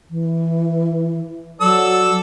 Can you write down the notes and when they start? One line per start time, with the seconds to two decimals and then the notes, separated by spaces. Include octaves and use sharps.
0.10 E3
1.61 F#3 A4 D5 E6